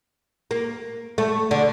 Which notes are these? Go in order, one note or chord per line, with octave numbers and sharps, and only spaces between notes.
A#3
A3
D3